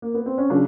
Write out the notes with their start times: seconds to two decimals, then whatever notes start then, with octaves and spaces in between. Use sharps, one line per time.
0.02 A#3
0.14 B3
0.26 C4
0.38 C#4
0.50 C#3 F#3 D4